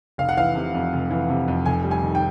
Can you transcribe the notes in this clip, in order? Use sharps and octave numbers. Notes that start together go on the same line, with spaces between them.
F1 F5
F#5
E3 F5
C3
F2
F1
E3
C3
F2
F1 G#5
G3
G#5
D#3
G5